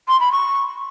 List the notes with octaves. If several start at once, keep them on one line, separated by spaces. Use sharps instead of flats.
C6
B5
C#6